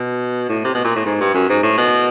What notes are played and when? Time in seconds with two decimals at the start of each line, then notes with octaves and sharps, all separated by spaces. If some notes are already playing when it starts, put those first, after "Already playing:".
Already playing: B2
0.49 A2
0.64 C3
0.74 B2
0.84 A#2
0.95 A2
1.05 G#2
1.20 G2
1.34 F#2
1.49 G#2
1.63 A2
1.77 B2